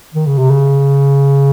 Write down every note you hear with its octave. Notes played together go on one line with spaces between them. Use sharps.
D#3
C#3
C3
C#3